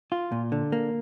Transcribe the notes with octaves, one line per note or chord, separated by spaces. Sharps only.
F4
A#2
D3
A#3